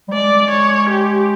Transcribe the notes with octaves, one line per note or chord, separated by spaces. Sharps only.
G3
G#3 D5
C#5
G4